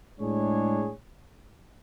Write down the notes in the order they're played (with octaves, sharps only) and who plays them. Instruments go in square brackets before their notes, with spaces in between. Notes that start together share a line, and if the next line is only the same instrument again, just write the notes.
[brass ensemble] A2 G#3 D4 G#4 C#5